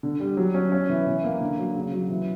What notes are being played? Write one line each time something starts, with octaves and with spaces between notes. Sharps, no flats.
D3
G3
F#3
C#4
C#4
E3
E3
A#3
D3
F#3
C#3
F#3
E3